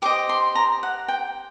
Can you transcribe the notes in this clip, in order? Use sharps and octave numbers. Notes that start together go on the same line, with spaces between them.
G4 C5 D#5 D6
C6
A#5
F#5
G5